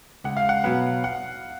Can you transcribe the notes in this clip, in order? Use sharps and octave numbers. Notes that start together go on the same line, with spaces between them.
C#2 F#5
F5
F#5
B2 F#3 B3 F#5
F#5